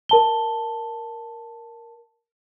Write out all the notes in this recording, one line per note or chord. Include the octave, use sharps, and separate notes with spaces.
A#4 A5 G7